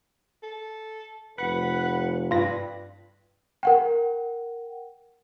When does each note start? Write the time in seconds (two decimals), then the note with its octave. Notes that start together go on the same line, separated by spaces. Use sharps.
0.43 A4
1.38 F1 B4 F#5
2.31 G2 F4 B4 A#6
3.63 A#4 F#5 G5